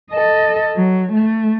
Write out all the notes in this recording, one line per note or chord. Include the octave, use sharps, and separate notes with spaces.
A4 D#5
F#3
A3